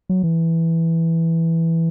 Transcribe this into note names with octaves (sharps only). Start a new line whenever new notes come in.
F#3
E3